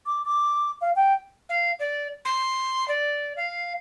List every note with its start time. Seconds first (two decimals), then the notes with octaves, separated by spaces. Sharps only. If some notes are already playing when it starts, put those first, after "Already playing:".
0.06 D6
0.25 D6
0.81 F5
0.96 G5
1.49 F5
1.80 D5
2.25 C6
2.88 D5
3.37 F5